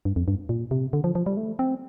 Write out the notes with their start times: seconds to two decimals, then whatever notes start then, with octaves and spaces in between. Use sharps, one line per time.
0.05 G2
0.16 F2
0.28 G2
0.49 A#2
0.71 C3
0.93 D3
1.04 F3
1.15 F3
1.26 G3
1.37 A3
1.59 C4